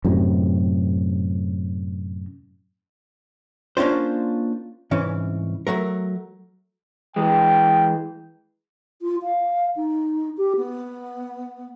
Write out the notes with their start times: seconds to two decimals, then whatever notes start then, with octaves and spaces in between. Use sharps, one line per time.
0.05 F#2 A2 C3 D#3
3.77 A#3 C#4 D4 F4 C5
4.91 C2 G#2 E3 C#4
5.67 F#3 A3 A#4
7.16 E3 G#3 G5
9.01 F4
9.23 F5
9.76 D#4
10.37 G4
10.56 B3